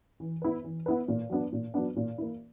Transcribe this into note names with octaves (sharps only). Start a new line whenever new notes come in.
E3
B3 E4 B4
E3
B3 E4 B4
A#2
F#3 B3 D4
A#2
F#3 B3 D4
A#2
A#3 E4